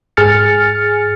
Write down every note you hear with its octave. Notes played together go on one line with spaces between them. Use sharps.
G#2 G#4 G#5 F6 A6 C#7